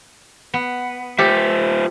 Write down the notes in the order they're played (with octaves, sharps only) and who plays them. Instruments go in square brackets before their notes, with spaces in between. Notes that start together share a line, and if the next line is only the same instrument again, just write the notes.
[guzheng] B3
[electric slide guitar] F4 C5 E5 [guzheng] G4 A4